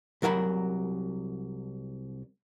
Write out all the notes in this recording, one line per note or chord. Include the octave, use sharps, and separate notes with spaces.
C2 F#3 A#4 F5 B5